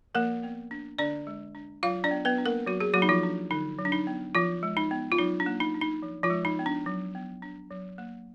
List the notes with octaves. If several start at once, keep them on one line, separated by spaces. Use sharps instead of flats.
F3 A#3 A#4
B3
D4
D3 D4 D5
G#3
D4
F#3 F4 F5
D4 D5
B3
B3 B4
D4
A#3 A#4
F#3 F#4
G#4
F#3 A#3 F#4
D#4
F3 F4
D4
D3 D#4
F#3
D4
D#4
B3
F3 F4
G#3
D#4
B3
F4
F#3 D#4
D4
A#3
D#4
D4
D#4
F3
F3 F4
G#3
D#4
B3
D4
F#3
B3
D4
F#3
A#3